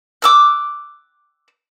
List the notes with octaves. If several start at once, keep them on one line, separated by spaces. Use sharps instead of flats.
D6 E6 F#6